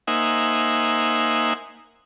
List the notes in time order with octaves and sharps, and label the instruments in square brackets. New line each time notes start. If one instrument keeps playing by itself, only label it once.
[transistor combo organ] A#3 D#4 C5 E5 F#5 G#5